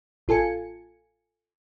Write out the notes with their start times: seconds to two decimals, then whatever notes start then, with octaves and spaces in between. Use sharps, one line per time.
0.28 A1 F4 A4 G#5 C#7